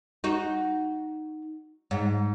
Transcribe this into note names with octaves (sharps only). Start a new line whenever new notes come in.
D#4 F#4
G#2